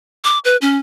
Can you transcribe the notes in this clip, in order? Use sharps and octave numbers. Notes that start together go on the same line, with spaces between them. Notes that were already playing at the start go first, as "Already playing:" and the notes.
D6
B4
C#4